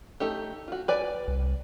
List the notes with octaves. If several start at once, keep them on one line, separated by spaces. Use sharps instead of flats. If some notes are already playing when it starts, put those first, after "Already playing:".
A3 D#4 G4
F4 F#4
B4 D5 G#5
C2